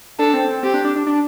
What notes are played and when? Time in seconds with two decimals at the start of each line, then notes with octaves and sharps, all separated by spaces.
0.19 D4 A4
0.34 C4
0.48 C4
0.63 C4 G4
0.74 D4
0.85 D4
0.96 D4
1.07 D4